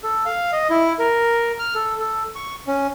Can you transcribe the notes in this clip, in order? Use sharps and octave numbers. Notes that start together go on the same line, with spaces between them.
A4
F5
D#5
E4
A#4
F6
A4
A4
C#6
C#4